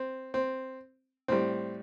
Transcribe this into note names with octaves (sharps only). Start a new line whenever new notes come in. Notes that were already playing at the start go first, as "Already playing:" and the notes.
Already playing: C4
C4
A2 G3 C4